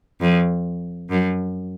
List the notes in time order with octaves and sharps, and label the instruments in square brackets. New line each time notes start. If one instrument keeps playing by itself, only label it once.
[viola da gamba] F2
F#2